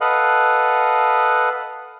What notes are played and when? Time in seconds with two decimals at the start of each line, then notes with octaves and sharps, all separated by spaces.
0.01 A4 B4 D#5 F5 F#5